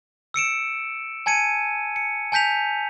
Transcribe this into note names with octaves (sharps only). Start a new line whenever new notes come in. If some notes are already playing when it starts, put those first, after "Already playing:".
E6 C#7 D7 E7
G#5 A5 G#6 C#7 D#7
C#7
G#5 A5 G6 B6 F7